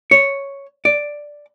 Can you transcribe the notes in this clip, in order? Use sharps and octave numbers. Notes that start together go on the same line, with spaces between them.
C#5
D5